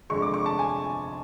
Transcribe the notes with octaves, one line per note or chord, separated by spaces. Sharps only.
F1 F2 D3 G#3 C#6
D6
C#6
A5
G#5